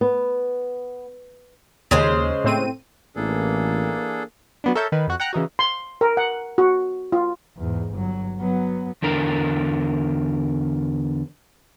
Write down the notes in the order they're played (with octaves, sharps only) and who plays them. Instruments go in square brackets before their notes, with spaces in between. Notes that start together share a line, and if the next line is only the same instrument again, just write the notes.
[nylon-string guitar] B3
[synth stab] D#2 [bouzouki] C#3 G#3 C5
[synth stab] A2 C4 D#7
[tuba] A1 [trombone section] E3 A#3 [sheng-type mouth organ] D4 G#4 A4
[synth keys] F#3 B3 D4
A4 A#4 C#5 E5 G6
D#3 B4
F2 F#4 F#6
F#5 G5 A#5 F#6
C#3 E3 D#4 F#4
[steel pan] C6
A#4
F#5
F#4
F4
[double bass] E2 G#2
G1 F#3
F#3 B3
[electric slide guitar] E2 D3 A#4